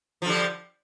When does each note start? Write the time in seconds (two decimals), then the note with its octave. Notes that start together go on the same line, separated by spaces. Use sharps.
0.22 F3
0.26 D3
0.30 G3